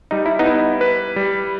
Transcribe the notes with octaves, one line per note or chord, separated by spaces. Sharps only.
G3 D#4
E4
B3 D#4
E4
B4
G3